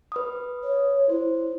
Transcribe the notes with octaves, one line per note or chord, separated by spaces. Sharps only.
B4 D#6
C#5
E4 C5